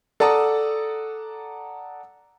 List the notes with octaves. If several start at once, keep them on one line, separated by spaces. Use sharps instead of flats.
A4 D5 F#5 A5 A#5 D#6